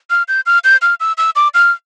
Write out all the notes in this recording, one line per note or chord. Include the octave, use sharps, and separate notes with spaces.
F6
G6
F6
G6
F6
E6
E6
D6
F6